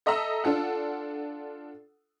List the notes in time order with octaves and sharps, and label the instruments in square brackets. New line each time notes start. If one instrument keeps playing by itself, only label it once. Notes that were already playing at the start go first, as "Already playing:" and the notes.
[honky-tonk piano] A4 D#5 E5 A#5 E6
D4 F4 A4 F#5